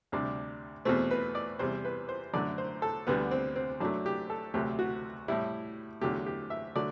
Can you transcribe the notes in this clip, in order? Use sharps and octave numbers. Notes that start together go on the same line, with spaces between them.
D2 C3 G3 D4
E2 B2 A3 C4
B4
D5
E2 C3 G3 C5
B4
C5
F#2 D3 A3 D5
C5
A4
D2 D3 G3 B3
C4
C4
F#2 F#3 A3 D4
G4
A4
D2 C3 F#3 A3 G4
F#4
A2 G3 E4
E2 D3 F#3 A3 G4
G4
E5
D3 F#3 A3 D5